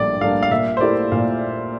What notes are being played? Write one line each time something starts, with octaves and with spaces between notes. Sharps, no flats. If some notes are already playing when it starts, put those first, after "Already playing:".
Already playing: A#1 A2 G3 A#3 D4 D5
A2 G3 A#3 D4 F5
F5
A#2 E5
C5
A3 E4 G4 A#4 D5
A#2 F5